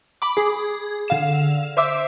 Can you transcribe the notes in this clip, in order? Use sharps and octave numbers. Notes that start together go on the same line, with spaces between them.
B5 D6
G#4
D3 F5 E7
C5 E5 D6 E6